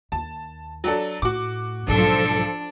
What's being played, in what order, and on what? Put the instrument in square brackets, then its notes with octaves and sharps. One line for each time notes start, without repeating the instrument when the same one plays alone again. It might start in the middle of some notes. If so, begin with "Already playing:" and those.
[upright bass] D#2 [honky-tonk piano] A5
[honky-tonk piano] F#3 D4 A4
[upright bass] A2 [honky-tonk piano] F#4 D6
[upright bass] B1 G#2 [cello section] F3 A4 [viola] D4